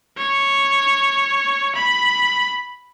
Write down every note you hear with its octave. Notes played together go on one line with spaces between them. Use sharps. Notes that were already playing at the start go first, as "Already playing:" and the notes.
C#5
B5